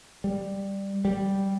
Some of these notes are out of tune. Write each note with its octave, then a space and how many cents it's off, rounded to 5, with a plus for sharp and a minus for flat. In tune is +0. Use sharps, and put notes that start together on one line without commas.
G3 +5
G3 -5